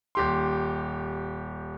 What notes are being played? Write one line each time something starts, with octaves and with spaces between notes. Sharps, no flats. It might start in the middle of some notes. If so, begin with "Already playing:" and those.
D#1 G4 C6